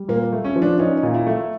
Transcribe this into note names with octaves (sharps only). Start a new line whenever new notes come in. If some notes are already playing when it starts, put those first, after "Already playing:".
Already playing: G3
A#2 A#3
A3
C#4
F3
D4
C#4 D#4
D#4
A#2
E4
A3